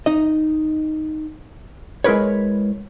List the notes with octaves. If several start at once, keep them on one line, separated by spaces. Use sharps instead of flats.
D#4 D#5
G#3 E4 A#4 B4 C#5